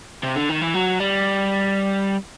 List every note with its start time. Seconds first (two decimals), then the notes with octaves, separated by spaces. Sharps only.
0.24 C3
0.36 D3
0.50 D#3
0.61 E3
0.74 F#3
1.00 G3